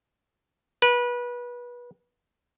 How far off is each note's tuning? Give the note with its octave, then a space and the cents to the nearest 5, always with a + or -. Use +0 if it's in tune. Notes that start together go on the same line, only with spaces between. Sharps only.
B4 -25